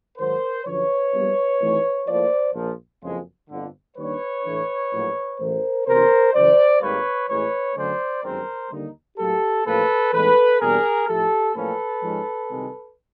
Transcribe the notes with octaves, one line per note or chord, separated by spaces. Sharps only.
G#2 D#3 F#3 A#4 C5
F#2 D3 F3 B4 C#5
A#1 A#2 G3 B3
G#1 G#2 E3 A3
A2 F3 A#3 C5 D5
A#1 A#2 F3
F#1 F2 C#3 F3 G#3
G1 F2 D3
D#2 D#3 G3 A#3 D4 B4 C#5
A2 E3 A3 D4
A#1 A2 F#3 A3
A1 A2 E3 A#4 C5
F#1 E2 C3 A#4 C5
F#2 C#3 E3 C5 D5
G#1 G#2 D#3 G3 A#3 B4 C#5
A1 A2 E3 G#3 B4 C#5
F#2 D3 F#3 A3 C#4 C5 D5
G1 F#2 D#3 G#3 C4 A#4 C5
D#2 D3 G3 A#3 D#4
A2 F#3 A#3 G4 A4
A1 A2 F3 A#3 A4 B4
A2 E3 G#3 B3 D#4 A4 B4
E2 B2 G3 A#3 D4 G#4 A#4
A2 F3 A3 G4 A4
A1 A2 F3 A#3 C#4 A4 B4
G#2 F3 G#3 C#4
C2 C3 D#3 G#3